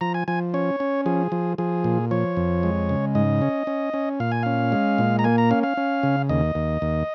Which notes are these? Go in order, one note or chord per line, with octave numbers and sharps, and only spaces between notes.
F3 A#5
G#5
F3 G#5
C#4 C#5
C#4
F3 G#4
F3
F3 G#4
A#2
F3 C#5
F2
G#3
C#3
G#2 D#5
C#4
C#4
C#4
A#2 F5
G#5
C#4 F5
G#3
A#2
A#5
A#3 G#5
A#5
C#4 F5
F5
C#4
C#3
D#2 D#5
D#2
D#2